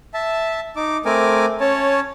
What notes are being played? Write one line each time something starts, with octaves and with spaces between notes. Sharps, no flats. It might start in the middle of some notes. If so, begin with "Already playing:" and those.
E5 A5
D#4 D6
A3 C4 A#4 G#5 D6
C#4 C#5 A5